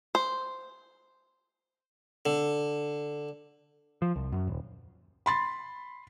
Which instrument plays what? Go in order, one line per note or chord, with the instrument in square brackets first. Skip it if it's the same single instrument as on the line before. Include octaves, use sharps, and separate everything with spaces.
[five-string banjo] C5
[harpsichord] D3
[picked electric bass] F3
C2
F#2
D#1
[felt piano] B5 C6 A6